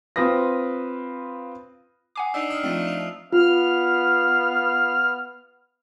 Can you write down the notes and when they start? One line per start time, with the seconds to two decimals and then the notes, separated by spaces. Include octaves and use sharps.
0.16 C4 F4 B4 D#6 A#6
2.16 F#5 G#5 D6 D#6 C7
2.34 D4 D#4 E6 C7 F7
2.50 G5 D#6 F6
2.64 F3 A3 C4
2.87 F7
3.33 B3 F4 F5 F6